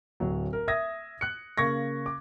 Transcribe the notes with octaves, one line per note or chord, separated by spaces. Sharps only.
D1 F#3
A#4
E5 D#6 G#6 A#6
F#6 C#7
C#3 A#3 C#6 G#6 A#6
D6